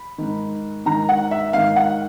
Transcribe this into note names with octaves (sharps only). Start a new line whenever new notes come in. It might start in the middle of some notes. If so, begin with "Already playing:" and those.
Already playing: B5
G#2 D#3
G#2 D#3 A#5
F#5
E5
G#2 D#3 F5
F#5